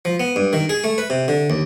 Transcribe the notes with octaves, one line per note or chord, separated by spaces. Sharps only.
F3
B3
G2
D#3
G#4
A3
B4
C3
D3
D#2